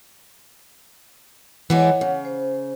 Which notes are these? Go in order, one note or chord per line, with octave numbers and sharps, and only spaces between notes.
E3 G#3 C#5 D5 F#5
C#3
C5